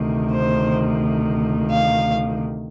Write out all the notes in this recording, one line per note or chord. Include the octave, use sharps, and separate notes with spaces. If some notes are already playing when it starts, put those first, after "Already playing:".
Already playing: D2 C3 D#3
C5
F5